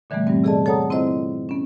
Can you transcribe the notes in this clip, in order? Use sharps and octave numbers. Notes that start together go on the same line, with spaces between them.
A#2 D3 E3 G3 A3 B3
G2 G3 C4
C3 G#4 A4 D5 D#5 A5
A4 C#5 F#5 A5 A#5 D#6
C4 E4 F4 C5 D#5
B3 C#4